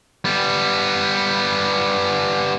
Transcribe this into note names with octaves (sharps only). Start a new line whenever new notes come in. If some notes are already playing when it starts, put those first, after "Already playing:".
G3 B3